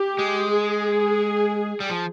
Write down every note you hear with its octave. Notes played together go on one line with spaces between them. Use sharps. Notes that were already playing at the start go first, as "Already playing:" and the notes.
Already playing: G4
G#3
G#4
G3
F3